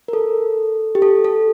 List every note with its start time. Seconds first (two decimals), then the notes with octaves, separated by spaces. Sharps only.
0.08 A#4
0.13 A4
0.95 G4
1.02 A4
1.24 A4